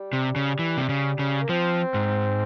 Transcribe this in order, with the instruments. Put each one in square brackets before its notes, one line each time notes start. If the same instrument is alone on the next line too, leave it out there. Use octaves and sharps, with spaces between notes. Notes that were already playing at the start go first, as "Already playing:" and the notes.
Already playing: [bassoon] G3
[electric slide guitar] C3
C#3
E3
C3
C#3
C#3
[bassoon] A#3
[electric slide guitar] F3 [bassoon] C4
[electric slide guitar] G#2